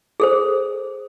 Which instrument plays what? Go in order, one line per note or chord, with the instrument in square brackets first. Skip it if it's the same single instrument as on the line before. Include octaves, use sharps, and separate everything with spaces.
[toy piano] G#4 A4 C5